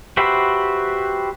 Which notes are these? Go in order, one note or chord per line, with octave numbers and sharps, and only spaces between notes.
F#4 G4 B4 C5 E5